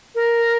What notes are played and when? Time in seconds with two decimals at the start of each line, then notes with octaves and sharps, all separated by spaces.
0.15 A#4